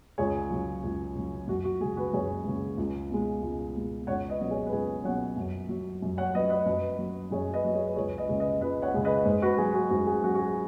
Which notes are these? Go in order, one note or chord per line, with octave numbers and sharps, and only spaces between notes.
C#2 G#4 C#5
C#3 F#3
C#2
C#3 F#3
F#2 F#4
F#4
C#3 G#3 G#4
F#4 B4
F#2 G#4 C#5
C#3 G#3
C#2
B2 G#3
C#2
B2 G#3
C#2 C#5 F#5
B4 D#5
B2 F#3 D#5
G#4 C#5
B4
C#2 G#4
B2 F#3 C#5 F#5
F#2
F#3
F#2
C#5 F#5
F#3 B4 D#5
B4 D#5
F#2 B4 D#5
F#3
F#2 G#4 C#5
B4 D#5
F#3
G#4 C#5
B4
C#2 G#4 C#5
B4 D#5
C#3 G#3
B4 D#5
C#2 B4 D#5
C#5 F#5
C#3 G#3
B4 D#5
G#2
F#4 B4
F#3 G#4
F#4
G#2 F#4
G#4
F#3 F#4
F#4
G#4